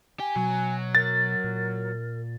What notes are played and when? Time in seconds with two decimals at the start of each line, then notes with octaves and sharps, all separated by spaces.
0.20 G4 G#5
0.36 B2 F#3
0.95 A#4 A6
1.44 A#2